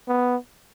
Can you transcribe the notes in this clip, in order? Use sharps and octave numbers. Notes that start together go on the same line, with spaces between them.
B3